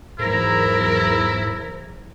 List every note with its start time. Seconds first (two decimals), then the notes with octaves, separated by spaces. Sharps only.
0.19 E2 G#2 F#3 E4 A#4 C5